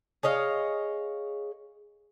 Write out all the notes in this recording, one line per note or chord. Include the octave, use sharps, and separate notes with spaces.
G#4 C#5 D#5 F5